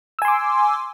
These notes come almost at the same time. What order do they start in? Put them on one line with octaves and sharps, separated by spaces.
E6 G#5 C6 D6